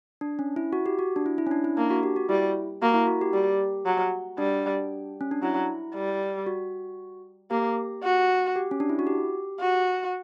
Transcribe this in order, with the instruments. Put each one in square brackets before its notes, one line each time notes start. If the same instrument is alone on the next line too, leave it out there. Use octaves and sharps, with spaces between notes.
[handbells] D4
C#4
E4
F#4
G4
F#4
D4
E4
E4
C#4
D4
E4
[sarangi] A#3 [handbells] D4
[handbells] F#4
G4
F#4
[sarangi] G3 [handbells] E4
[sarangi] A#3 [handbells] F#4
[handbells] E4
F#4
G4
[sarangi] G3 [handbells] G4
[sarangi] F#3
[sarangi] G3 [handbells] D4
[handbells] C#4
D4
[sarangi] F#3 [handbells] E4
[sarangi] G3
[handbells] F#4
[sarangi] A#3 [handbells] G4
[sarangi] F#4
[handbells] G4
C#4
D4
E4
F#4
G4
[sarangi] F#4